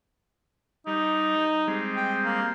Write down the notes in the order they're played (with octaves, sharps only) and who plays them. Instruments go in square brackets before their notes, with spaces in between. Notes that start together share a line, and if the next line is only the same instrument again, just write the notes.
[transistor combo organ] G3 [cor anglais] D#4
[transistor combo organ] G3 G#3 C4
[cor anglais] G5
A#3